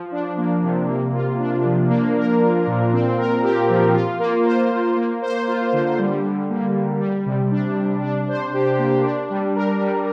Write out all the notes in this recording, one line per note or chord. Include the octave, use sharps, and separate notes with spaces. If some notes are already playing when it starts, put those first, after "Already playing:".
Already playing: F3
D4
A#3
C3
A#3
F4
D4
F3
A#3
A#4
F4
A#2
C4
A#4
G4
F3
F4
A#3
C5
A#3
A#3
C5
F4
D3
G3
D3
A#3
D3
G3
C3
D4
C3
D4
C5
G4
A#3
D4
G3
A#4
G3